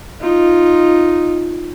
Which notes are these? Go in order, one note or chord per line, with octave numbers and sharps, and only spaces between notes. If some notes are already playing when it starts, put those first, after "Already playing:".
D#4 F4